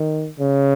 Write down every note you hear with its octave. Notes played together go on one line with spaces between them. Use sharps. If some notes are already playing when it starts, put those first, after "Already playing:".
Already playing: D#3
C#3